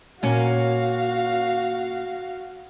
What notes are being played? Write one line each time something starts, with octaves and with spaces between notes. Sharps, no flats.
A#2 C#4 F#4 F5